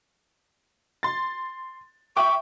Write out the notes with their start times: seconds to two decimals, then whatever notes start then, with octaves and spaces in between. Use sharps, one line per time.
1.03 C6 A6
2.17 E5 G5 C#6 D6